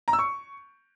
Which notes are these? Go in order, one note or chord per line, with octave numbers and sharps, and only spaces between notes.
A#5
E6
C#6